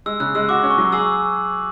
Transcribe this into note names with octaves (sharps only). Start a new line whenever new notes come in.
G#3 E6
C#3 F#6
G#3 E6
F#4 D6
C#4
C#6
F#3
G#4 E6